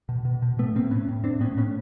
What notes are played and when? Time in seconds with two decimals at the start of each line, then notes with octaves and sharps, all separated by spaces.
0.09 B2
0.25 B2
0.42 B2
0.58 A2 A3 B3
0.75 A2 A#3 C4
0.91 A2 B3 C#4
1.09 A2
1.24 A2 C4 D4
1.41 A2 B3 C#4
1.57 A2 B3 C#4